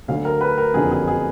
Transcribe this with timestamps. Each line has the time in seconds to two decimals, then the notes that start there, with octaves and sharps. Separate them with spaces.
0.08 D2 D3 F#3 F5
0.25 A#4
0.41 B4
0.58 A#4
0.74 F#1 F2 D3 F#3 G#4
0.91 G#4
1.08 G#4